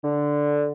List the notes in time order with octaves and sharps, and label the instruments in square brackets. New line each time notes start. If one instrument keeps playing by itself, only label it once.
[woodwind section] D3